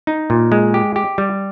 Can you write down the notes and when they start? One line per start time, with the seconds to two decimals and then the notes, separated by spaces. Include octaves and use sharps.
0.07 D#4
0.30 A#2
0.52 G#3
0.74 G4
0.96 G4
1.18 G3